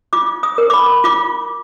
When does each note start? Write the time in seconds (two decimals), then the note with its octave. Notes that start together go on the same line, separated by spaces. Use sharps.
0.13 F4 D6
0.43 D#6
0.58 A#4
0.70 D6
0.74 B5
1.04 F4 D6